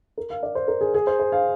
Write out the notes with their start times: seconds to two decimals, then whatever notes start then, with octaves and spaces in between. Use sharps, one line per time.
0.18 A#4
0.30 F5
0.43 D5
0.55 C5
0.68 A#4
0.81 G#4
0.94 G#4
1.07 C5
1.20 C5
1.32 F5